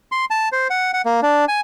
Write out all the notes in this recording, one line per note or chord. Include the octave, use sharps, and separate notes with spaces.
C6
A5
C5
F#5
F#5
A#3
D4
G#5